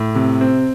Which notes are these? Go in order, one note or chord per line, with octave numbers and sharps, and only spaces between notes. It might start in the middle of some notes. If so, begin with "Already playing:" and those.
Already playing: A2
C3
C4